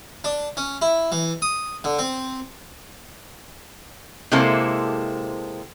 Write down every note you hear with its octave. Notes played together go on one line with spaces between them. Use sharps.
D4
C#4
E4
E3
D#6
D3
C4
C3 G#3 A#3 E4 A4 C5